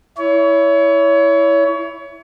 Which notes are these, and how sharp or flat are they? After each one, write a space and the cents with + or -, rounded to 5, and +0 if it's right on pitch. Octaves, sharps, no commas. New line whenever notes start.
E4 +0 C#5 +25